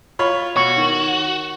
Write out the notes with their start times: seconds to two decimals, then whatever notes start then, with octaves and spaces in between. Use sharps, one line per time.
0.19 F4 C#5 B5
0.56 B2 F#4 C#5
0.77 D#3